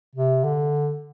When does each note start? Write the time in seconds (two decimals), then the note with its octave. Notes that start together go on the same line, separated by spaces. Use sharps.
0.15 C3
0.44 D3